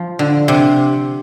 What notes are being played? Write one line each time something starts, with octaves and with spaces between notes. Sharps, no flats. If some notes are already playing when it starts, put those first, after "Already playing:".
Already playing: F3
D3
C3